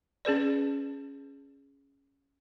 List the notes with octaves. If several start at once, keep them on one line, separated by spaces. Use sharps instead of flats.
C#4 G#4 B4 D5